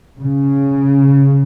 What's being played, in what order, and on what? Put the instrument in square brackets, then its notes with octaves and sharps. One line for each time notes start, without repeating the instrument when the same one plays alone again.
[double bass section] C#3